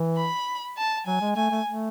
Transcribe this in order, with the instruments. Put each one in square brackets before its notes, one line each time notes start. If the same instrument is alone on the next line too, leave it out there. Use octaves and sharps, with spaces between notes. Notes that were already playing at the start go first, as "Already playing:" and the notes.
Already playing: [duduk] E3
[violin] B5
A5
[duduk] F#3 [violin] G#5
[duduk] G#3
[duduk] A3 [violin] G#5
[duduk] A3
A3